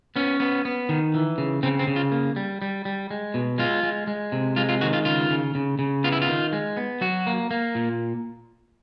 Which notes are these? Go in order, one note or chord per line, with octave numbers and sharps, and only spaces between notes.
B3 C#4
B3
B3
D#3
E3
C#3
C#3 C4
C4
C#3
F4
A#3
G3
G3
G3
G#3
B2
G#3 F4
G#3
G#3
C3
G#3 F4
F4
D#3 F#4
F4
C#3 F4
C#3
C#3
C#3
B3 F4
E4
F4
D#3
G#3
B3
F#3 F#4
A#3
A#3
A#2